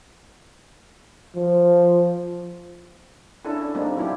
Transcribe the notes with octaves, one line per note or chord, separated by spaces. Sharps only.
F3
C#4 D4 E4 A4
D4
G3 A#3 C4 D4 D#4
F#3 C#4 E4 F4 G4